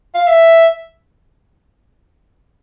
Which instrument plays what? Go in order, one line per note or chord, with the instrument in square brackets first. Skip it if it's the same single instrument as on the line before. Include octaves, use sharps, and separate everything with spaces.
[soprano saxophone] F5
E5